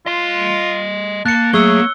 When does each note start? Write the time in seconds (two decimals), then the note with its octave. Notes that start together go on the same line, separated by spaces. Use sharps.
0.06 F4 D#5 C6
1.26 A#3 A5 F#6 C#7
1.53 F#3 A3 G#4 C#5 E6 G7